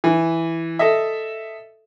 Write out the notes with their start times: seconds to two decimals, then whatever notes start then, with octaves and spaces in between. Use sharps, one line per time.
0.04 E3
0.79 A4 D#5 E5